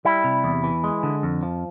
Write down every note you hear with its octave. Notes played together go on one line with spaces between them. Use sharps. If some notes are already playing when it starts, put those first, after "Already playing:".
G3 E4
C3
E2
E3
G#3
D3
F2
F3